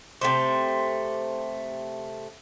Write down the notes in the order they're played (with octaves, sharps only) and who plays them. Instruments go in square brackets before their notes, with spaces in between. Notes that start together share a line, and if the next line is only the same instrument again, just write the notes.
[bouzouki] C3 A3 C5